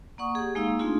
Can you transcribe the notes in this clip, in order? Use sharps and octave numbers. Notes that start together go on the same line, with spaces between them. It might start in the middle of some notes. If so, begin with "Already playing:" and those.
A#3 D5 F#5 C#6 D#6
G4 G#4
G#3 A#3 D#4 F5 E6
A3 C4 D4 D#4 F4 G#4